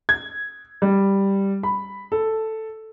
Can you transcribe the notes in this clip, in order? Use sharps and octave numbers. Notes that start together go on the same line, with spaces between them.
G#6
G3
B5
A4